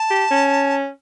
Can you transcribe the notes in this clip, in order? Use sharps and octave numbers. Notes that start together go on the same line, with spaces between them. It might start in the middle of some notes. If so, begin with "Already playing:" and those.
Already playing: A5
G4
C#4